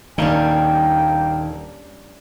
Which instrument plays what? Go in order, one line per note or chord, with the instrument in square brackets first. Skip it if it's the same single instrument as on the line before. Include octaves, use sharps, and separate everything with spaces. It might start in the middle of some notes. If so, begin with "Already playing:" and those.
[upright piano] D#1 A#3 [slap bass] D#3 [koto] G3 C#4 D4 [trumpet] G5